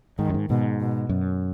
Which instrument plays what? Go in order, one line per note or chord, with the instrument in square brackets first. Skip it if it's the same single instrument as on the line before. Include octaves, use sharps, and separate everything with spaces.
[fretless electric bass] G#2 [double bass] D#3
[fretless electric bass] F#2
G#2
[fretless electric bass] G#2 [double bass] B2
[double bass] B2
[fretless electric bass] F#2